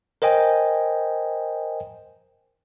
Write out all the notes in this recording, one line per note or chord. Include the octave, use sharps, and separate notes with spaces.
A#4 C5 D#5 G5 G#5